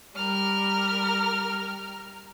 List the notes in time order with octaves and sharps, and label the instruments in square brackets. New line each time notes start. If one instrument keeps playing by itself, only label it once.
[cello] G3 [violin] A#4 F6